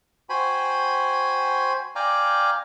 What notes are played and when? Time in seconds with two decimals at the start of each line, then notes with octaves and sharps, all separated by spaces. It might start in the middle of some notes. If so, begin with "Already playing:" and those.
0.30 F#4 C5 G5 G#5 B5
1.96 D5 F5 G5 G#5 A#5